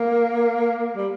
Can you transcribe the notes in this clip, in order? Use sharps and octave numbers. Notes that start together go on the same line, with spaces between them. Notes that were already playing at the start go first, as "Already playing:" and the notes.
Already playing: A#3
G3